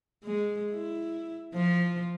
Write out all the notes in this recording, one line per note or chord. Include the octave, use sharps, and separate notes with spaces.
G#3
E4
F3